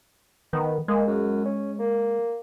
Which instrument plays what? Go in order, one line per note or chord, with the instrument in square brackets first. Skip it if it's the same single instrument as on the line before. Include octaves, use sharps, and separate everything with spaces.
[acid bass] D#3 [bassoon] B3
[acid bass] G#3 [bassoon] A#3
[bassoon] F#2
C#4
A#3